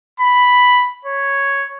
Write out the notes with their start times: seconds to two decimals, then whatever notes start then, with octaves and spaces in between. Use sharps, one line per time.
0.20 B5
1.05 C#5